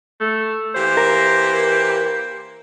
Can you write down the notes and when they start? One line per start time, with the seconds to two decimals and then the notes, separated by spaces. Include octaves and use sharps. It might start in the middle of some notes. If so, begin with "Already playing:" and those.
0.20 A3
0.74 E3 A#3 G4 C5
0.97 A#4